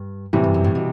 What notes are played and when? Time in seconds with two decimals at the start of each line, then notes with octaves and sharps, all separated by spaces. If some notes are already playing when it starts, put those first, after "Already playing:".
Already playing: G2
0.33 A2 C3 E3 G3
0.44 G2
0.54 F#2
0.64 A2
0.75 B2